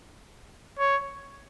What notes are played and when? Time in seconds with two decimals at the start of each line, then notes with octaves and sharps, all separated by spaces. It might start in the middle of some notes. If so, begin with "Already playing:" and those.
0.79 C#5